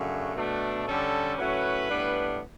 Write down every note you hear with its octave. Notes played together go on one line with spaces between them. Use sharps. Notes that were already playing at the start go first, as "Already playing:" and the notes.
Already playing: F#2 C#3 F#3 A3 D4
B2 A3 D4
D3 G3 C#4 A4
A2 F#3 A3 C#4 B4
A2 G3 B3 D4